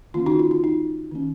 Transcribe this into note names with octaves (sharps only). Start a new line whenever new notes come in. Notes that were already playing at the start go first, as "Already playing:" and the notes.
D#3 A#3 C#4 F4
D#4 F#4
F4
F4
D#4
D#3 A#3 C#4